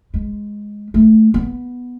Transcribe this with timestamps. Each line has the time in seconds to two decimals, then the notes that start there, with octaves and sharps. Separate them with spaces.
0.14 G#3
0.94 A3
1.34 B3